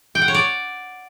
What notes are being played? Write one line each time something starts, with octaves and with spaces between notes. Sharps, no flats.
G5
F#5
C#5
D5